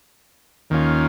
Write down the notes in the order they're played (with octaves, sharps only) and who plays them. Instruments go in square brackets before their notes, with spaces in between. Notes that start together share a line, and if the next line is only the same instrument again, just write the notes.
[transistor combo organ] D#2 D#3 A#3 C#4 F4